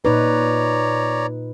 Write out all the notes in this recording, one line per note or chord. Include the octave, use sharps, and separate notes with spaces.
A#2 D#4 B4 C#5 D5 A#5